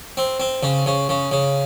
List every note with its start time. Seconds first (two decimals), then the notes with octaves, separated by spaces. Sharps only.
0.17 C4
0.40 C4
0.63 C#3
0.86 C#3
1.09 C#3
1.32 C#3